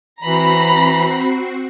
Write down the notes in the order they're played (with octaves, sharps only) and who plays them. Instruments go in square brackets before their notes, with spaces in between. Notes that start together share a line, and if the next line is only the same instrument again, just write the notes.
[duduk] E3 [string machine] C4 F#4 C7 [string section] A#5 B5